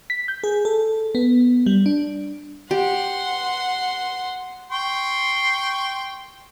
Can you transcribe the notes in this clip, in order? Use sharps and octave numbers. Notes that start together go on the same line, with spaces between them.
B6
G6
G#4
A4
B3
G3
D4
G4 F#5 C6
G5 C6 C#6